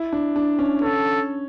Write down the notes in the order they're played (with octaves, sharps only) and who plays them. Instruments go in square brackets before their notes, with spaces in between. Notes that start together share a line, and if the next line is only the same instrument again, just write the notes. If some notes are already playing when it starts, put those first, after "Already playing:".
Already playing: [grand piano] E4
D4
D4
C#4
[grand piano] C#4 [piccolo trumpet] A4